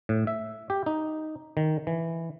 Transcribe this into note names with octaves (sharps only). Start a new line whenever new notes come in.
A2
E5
G4
D#4
D#3
E3